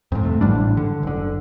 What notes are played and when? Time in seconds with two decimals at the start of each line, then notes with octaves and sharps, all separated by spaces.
0.12 F2 G#2
0.23 C3 A3
0.41 A1 G#2 G3 D4
0.77 D3
1.03 F#1 D3